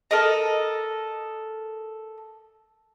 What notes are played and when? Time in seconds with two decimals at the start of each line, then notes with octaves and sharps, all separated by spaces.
0.11 A4 A#4 D#5